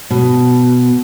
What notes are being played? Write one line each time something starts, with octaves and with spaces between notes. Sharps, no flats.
B2